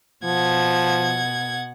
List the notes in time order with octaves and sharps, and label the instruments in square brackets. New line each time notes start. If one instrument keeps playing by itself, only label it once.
[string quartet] B2 F#5 G#6 [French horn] F3